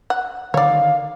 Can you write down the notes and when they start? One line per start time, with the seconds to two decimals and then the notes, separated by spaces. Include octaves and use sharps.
0.10 F#5
0.54 D3 D#3 C#5 D5 F5